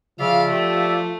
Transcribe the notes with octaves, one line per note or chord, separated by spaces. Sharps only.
C#3 F3 D5 E5 F5
A3 G4